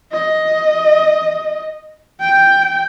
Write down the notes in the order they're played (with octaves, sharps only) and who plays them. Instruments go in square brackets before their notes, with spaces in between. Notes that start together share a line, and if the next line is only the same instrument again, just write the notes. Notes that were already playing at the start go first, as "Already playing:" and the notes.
[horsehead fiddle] D#5
G5